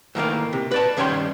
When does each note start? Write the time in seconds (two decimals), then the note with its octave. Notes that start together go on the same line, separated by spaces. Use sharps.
0.15 A2 D#3 A#3 A#4
0.53 C3
0.71 B4 D5 A5
0.97 G2 D#3 C#4 C#5 G5 C6